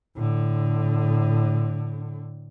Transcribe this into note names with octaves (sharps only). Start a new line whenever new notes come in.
A2 D3